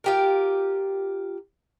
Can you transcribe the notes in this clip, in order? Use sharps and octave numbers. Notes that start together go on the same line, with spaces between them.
F4 G4 A#4